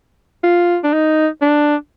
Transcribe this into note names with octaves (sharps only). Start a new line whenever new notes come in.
F4
D4
D#4
D4